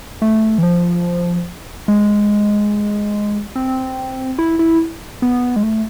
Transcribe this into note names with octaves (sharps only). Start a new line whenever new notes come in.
A3
E3
F3
G#3
C4
E4
E4
B3
G#3
A3